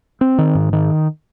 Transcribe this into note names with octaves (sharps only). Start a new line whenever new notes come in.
C4
D#3
G#2
D#3